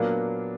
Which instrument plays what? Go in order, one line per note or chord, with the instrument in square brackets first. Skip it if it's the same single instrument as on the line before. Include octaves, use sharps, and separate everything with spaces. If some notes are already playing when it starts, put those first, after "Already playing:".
Already playing: [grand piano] A#2 F#3 B3 D4 [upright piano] A#3